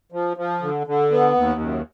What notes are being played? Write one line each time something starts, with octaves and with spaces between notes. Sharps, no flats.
F3
F3
D3
D3
B3
D#2
F#2